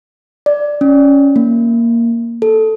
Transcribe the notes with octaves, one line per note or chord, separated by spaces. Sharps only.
D5
C#4
A#3
A4